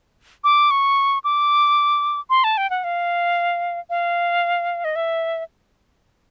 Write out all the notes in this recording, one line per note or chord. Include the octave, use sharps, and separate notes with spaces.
D6
C#6
D6
C6
A5
G5
F#5
F5
F5
D#5
E5